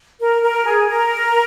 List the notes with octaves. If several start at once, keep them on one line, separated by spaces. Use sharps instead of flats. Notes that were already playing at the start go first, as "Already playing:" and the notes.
A#4
A#4
G#4
A#4